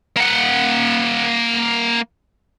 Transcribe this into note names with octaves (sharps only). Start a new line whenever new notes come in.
A#3 F#5